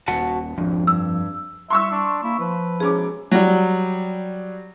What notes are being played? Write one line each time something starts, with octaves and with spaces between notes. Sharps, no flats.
D#1 F#4 F#5 A5
G#1 F2 D4
G2 E6
G3 E5 C6 C#6 E6
D4
A#3 E4
F3 B4
E1 C#4 G#4 D6
F#3 G3